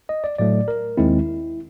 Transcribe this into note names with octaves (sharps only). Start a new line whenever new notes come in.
D#5
D5
A2 F#3 A3 D5
A#4
D#2 D#3 G#3 C4 E4